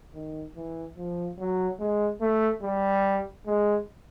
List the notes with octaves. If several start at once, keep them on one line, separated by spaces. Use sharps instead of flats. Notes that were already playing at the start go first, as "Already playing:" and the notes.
D#3
E3
F3
F#3
G#3
A3
G3
G#3